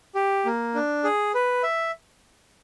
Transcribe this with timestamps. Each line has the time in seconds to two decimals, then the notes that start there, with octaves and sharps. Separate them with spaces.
0.15 G4
0.45 A#3
0.74 D4
1.04 G#4
1.34 B4
1.63 E5